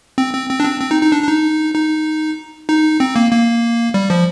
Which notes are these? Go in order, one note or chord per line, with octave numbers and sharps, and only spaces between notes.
C4
C4
C4
D4
C4
C4
D#4
D#4
D4
D4
D#4
D#4
D#4
C4
A#3
A#3
G3
F3